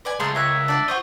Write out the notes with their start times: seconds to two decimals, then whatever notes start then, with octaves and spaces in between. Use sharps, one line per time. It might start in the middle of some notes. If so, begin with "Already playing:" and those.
0.05 B4 D5 G#5
0.20 C#2 G#3 A3 F4 G#4 A#4 A5 C6
0.35 G4 A#4 C#5 E5 F#6
0.68 D4 D5 F#5
0.88 F4 C5 F#5 C6 C#6 D#6